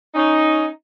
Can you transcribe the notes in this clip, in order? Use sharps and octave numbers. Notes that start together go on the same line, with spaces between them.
C#4 D#4